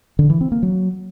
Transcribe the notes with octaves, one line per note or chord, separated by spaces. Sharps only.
D3
E3
C4
A#3
F#3